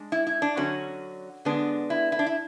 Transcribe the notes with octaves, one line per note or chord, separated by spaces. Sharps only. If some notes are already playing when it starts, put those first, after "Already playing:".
Already playing: G#3 D4
E4
E4
D4
D3 F#3 C#4 F#4
D3 G#3 B3 D4
E4
E4
D4
E4